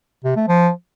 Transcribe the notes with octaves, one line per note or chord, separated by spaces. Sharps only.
C3
A3
F3